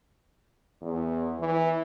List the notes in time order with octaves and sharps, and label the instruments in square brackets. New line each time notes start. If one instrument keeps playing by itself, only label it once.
[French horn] E2
E3